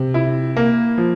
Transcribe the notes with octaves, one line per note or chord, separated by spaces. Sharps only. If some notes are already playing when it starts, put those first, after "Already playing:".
Already playing: C3
E4
A#3
F3